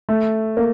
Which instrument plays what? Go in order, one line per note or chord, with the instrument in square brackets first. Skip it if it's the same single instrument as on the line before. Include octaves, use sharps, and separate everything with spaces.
[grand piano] A3
A#3